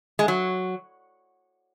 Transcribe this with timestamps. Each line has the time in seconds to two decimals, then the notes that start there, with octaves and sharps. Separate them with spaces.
0.19 G#3
0.28 F#3